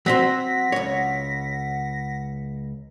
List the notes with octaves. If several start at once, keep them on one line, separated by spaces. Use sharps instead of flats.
F#3 C4 C5 F#5 A#6 B6
C#2 C#5